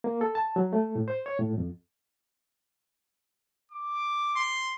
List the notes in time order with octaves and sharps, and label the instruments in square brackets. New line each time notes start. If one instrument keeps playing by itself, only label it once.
[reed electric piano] A#3
A4
A5
F#3
A3
A2
C5
C#5
A2
F2
[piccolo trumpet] D6
[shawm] C6